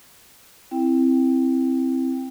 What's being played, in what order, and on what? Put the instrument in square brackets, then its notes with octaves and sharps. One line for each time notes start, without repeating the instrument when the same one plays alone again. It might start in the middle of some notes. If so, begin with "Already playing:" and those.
[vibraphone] C4 E4 G5